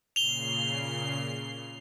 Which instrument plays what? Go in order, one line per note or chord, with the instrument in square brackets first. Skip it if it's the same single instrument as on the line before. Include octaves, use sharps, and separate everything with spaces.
[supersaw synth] A#2 C#3 C7 [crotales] F7 G7